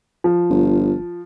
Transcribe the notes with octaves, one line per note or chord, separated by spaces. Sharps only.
F3
G1